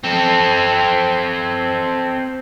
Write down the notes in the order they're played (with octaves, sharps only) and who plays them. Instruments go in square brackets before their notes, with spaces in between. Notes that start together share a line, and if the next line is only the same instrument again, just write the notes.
[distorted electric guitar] C4 A4